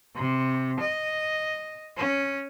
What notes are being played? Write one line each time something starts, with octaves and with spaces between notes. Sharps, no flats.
C3
D#5
C#4